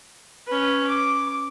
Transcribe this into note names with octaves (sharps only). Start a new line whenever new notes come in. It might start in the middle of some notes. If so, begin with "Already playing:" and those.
C#4 B4
D6